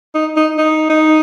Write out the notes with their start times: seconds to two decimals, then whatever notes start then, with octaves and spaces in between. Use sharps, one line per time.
0.15 D#4
0.36 D#4
0.58 D#4
0.90 D#4